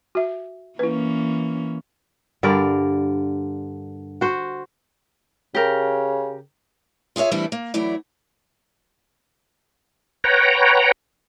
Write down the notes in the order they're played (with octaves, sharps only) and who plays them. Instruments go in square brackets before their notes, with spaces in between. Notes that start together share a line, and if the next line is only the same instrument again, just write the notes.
[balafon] F#4 E5
[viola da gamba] E3 A#3 C#4 [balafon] E4 B4
[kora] G2 D3 A#4 D5
F#4 C5
[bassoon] C#3 [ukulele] G4 A#4
[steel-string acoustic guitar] F4 G#4 A#4 C#5 E5
E3 G3 A3 C4 D4 E4
A#3
E3 F#3 A3 E4 D5
[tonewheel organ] B4 C#5 F#5 G5 A#5